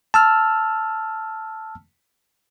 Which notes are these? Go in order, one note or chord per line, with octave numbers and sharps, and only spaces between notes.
A5 E6 F6